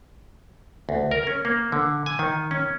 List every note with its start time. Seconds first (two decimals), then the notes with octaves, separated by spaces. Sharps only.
0.89 D2
1.11 A#4
1.27 C#4
1.45 A#3
1.72 D3
2.06 G#5
2.19 D#3
2.51 C#4